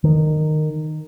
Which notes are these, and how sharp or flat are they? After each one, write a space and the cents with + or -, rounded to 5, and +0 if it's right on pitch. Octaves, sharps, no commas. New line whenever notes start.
D#3 -15